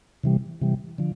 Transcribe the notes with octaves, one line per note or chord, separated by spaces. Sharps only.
C3 E3 G3
C3 E3 G3
D3 F3